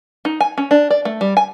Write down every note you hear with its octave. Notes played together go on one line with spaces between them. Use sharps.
D#4
G#5
C#4
D4
D5
A3
G3
G#5